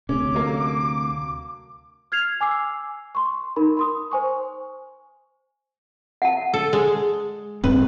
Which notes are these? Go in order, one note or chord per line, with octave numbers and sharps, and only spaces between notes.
D2 C3 C#4 D6
F#3 A#3 A4
F6 G#6 C7 F7
G#5 D6 E6 C7
C6 C#6
D#4 A#4 B5
B5 C6 D#6
C5 G#5 C#6
F#5 A5
A4
G#3
D1 G2 C4 B4